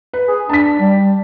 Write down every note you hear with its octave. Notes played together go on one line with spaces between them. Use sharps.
B4
G#4
D4 A5 B6
G3